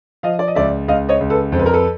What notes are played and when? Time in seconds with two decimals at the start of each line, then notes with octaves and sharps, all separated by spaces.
0.23 F3 D#5 F5
0.39 D5
0.48 D#5
0.55 C#2 D5 E5
0.88 C#2 D#5 F5
1.09 C#5 D#5
1.20 C#2
1.30 A4 B4
1.52 F2 C5
1.59 B4
1.66 A#4
1.73 A4 B4